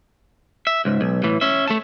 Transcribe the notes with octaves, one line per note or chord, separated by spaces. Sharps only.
E5
C#2 G#2
B1
A2 E3
C#4 E5
A3 A5